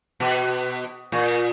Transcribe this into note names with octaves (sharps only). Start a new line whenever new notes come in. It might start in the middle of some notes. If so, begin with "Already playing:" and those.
B2
A#2